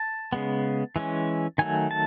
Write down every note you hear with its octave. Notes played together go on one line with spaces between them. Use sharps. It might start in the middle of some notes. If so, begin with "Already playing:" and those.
Already playing: A5
C#3 G#3 B3
E3 G#3 C#4
D#3 F#3 A3 G#5
A5